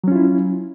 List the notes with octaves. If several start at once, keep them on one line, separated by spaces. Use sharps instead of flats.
F#3 C#4 E4 F4